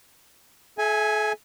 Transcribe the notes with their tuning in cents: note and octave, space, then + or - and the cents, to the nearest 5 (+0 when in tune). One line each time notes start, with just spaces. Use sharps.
A4 -45 E5 +0 G#5 +0